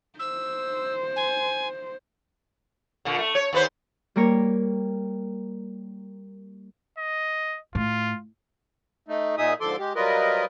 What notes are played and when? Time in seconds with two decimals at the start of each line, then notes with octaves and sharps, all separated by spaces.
0.19 C5 E6
1.16 G#5
3.05 A#2 D3
3.18 A3
3.35 C#5
3.53 D#2 B4 C5
4.16 G3 A#3 A#4 C#5
6.98 D#5
7.75 A2 F4
9.08 A3 D#4
9.38 A#2 D#4 G#4 E5 D#6
9.61 G#2 D3 F3 A4 C6 D6
9.79 G#3 G4
9.96 F#3 G3 F4 A#4 B4 D#5